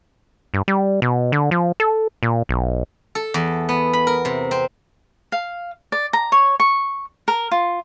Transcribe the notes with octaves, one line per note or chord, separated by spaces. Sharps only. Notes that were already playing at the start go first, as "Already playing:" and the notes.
G2
G3
B2
D3
F3
A4
A#2
B1
A4
E2
B3
B5
A#4
C3
C4
F5
D5
A#5
C#5
C#6
A#4
F4